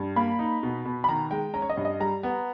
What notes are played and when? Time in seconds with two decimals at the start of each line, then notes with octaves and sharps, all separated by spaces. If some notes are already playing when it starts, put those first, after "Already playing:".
Already playing: G2
0.16 A#3 B5
0.39 D#4
0.63 B2
0.85 B2
1.04 B5
1.09 D#3 A#5
1.31 G#3 G5
1.54 C#4 A#5
1.62 C#5
1.70 D#5
1.77 G2
1.85 D#5
2.00 G3 A#5
2.23 B3